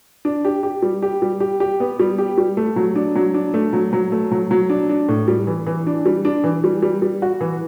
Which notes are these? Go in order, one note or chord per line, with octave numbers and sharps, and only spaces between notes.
D4
G4
G4
G3
G4
G3
G4
G4
B3
G3
G4
G3
A3
F#3
D4
F#3
D4
A3
F#3
F#3
A3
F#3
F#3
D4
D4
A2
G3
E3
E3
D4
G3
D4
E3
G3
G3
G3
F#4
E3